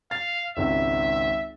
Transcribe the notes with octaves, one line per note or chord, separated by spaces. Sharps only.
F5 A6
G#1 C#2 E5